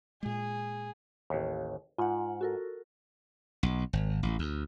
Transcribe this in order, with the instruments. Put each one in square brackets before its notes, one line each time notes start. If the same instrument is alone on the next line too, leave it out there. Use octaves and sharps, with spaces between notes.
[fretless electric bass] A#2 G#3 [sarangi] G#4
[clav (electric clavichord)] A1 D#2
[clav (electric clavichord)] G#2 [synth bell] F4 F#5
[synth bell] F#4 A4 A#4
[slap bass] B1
G#1
A1
D2